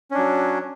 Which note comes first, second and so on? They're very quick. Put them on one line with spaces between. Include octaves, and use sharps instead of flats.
C#4 D4 F#3